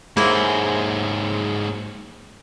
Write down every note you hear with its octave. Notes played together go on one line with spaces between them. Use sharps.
G#2 F#3 A#3 E4 G#4 C5